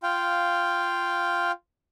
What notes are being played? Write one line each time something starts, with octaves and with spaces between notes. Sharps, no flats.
F4 F5 G5